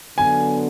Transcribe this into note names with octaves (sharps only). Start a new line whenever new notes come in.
D3 F#3 B3 G#5